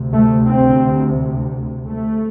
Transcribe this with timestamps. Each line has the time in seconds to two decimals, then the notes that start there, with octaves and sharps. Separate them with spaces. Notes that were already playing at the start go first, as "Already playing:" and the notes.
Already playing: D2 C3
0.13 A3
0.48 C4
1.87 A3